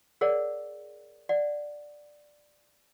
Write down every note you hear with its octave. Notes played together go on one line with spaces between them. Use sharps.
G#4 A#4 C#5 D5 F#5
D5 F#5